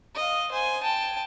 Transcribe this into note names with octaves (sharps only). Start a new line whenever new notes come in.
D#5 F5
C5 G#5
G5 A5